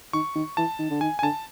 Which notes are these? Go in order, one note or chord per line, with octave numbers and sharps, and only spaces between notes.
D#3 C#6
D#3
E3 A5
D#3
D3
D#3 G#5
G#5
D3 A5